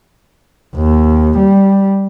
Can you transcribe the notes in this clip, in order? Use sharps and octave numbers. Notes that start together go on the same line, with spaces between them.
D#2
G3